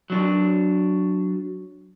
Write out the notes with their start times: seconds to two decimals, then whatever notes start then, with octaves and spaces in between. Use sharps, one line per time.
0.10 F#3 D4